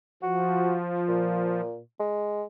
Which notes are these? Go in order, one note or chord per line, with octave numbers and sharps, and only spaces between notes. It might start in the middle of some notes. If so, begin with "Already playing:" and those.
F3 F#4
A#2
G#3